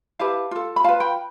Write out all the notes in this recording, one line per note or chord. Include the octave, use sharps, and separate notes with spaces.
E4 G4 B4 F5 A5
F4 A4
B5
F4 B4 F5 A5
G5 B5